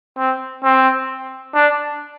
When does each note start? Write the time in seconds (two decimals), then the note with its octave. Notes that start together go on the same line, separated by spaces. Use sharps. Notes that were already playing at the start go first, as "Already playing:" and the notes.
0.18 C4
0.64 C4
1.54 D4